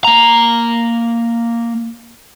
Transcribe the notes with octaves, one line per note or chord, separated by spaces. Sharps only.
A#3 A#5